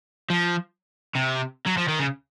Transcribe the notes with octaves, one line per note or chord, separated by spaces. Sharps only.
F3
C3
F#3
F3
D#3
C#3